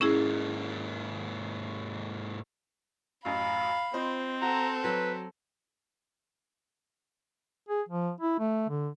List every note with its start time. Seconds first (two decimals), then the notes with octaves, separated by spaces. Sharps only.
0.01 G#2 A#3 C#4 E4 G#4
3.25 A1 F#2 F5 B5
3.94 C4 F4 C5 D#5
4.42 F#4 A4 A#5
4.84 F#3 B4
7.69 G#4
7.89 F3
8.21 E4
8.39 A3
8.69 D3